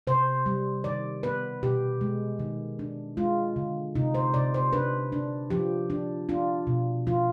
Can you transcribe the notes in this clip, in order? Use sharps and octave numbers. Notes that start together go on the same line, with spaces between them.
C3 C5
G3
D#3 D5
B3 B4
B2 G4
G#3
D#3
D4
G#3 F4
D3
C3 D#4
C5
C3 D5
C5
D4 B4
D4
F3 G4
D4
D4 F4
B2
F3 F4